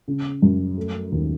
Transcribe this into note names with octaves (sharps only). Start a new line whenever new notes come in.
C#3
F#2
A3
D#2